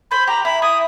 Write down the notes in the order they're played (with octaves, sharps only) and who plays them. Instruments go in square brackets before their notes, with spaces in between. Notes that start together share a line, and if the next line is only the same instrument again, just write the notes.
[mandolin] C5 [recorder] B5
[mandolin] G4 [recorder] A#5
[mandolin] E4 [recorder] B5
[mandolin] E4 [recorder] D#6